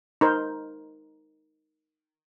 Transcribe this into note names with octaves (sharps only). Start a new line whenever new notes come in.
D#4 A#4 C5